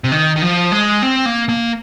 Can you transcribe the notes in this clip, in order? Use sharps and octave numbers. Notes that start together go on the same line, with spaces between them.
C3
D#3
D#3
F3
G#3
C4
A#3
A#3